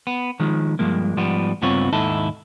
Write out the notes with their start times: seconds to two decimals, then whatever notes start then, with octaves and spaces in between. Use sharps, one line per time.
0.07 B3
0.40 D#3 F3 G#3
0.79 G2 F3 G#3 A#3
1.17 G#2 F3 G3 B3
1.62 C#2 G2 B3 C4 F4 C#5
1.92 D#2 G#2 D#4 E4 A4